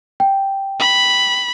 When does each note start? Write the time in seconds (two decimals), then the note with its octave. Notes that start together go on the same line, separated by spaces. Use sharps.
0.20 G5
0.80 B5